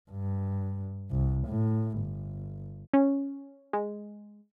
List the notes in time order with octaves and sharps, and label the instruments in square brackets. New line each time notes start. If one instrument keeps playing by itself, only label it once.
[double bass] G2
C2
A2
G1
[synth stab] C#4
G#3